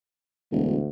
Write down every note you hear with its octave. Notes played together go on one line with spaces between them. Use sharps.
E1 D2